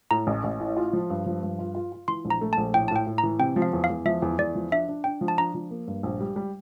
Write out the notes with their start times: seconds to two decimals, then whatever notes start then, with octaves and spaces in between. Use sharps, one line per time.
0.11 A2 A#5
0.27 A1
0.44 A1
0.60 A2
0.77 F4
0.93 F3
1.10 G2
1.26 F3
1.43 G2
1.59 F4
1.75 F4
1.92 F4
2.08 E3 C6
2.25 A#1
2.30 A#5
2.41 A3
2.53 A#1 A5
2.74 A2 G5
2.88 A5
2.91 A2 G5
3.07 A2
3.18 A#5
3.23 E3
3.39 C3 G5
3.56 F3
3.62 F5
3.73 E2
3.84 F5
3.90 E2
4.05 F3 E5
4.22 E2
4.39 E2 D5
4.55 F3
4.72 D4 E5
4.88 D4
5.04 D4 G5
5.21 F3
5.28 A5
5.38 D4 A#5
5.55 F3
5.71 A#3
5.87 G2
6.03 A#1
6.20 G3
6.36 G3